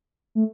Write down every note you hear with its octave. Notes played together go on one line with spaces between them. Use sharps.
A3